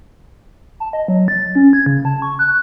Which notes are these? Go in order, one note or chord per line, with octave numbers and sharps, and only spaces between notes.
A5
D#5
F#3
A6
C#4
G#6
C#3
A5
C#6
F#6